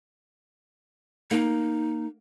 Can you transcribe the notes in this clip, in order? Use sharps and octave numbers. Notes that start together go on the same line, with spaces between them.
A#3 D#4